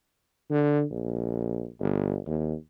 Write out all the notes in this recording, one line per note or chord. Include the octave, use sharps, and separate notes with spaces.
D3
A#1
G1
D#2